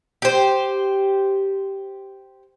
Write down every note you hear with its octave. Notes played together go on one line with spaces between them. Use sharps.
G4 C5